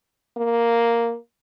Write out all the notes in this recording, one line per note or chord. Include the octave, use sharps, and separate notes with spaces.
A#3